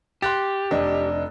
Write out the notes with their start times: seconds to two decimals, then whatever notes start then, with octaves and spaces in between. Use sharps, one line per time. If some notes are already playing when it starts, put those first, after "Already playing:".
0.22 G4 C6 F#6 A6
0.71 F1 D4 D#5